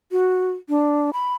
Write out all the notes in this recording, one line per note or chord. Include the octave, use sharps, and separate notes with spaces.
F#4
D4
B5